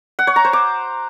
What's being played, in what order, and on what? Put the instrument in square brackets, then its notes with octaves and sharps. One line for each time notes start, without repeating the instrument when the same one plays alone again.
[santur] F#5
C#5
A#5
C5
D6